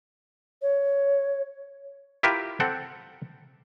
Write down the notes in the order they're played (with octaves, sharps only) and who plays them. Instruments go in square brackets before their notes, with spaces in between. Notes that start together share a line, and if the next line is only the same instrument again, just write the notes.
[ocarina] C#5
[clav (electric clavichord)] E4 F4 G4 A#4 B4 E5
C4 A4 F#5 G5